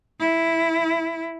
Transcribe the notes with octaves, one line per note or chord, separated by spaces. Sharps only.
E4